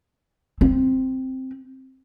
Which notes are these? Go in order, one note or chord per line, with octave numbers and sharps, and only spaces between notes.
C4